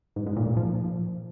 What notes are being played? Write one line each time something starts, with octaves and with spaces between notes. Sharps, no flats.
G#2
G#2
A#2
A#2
F3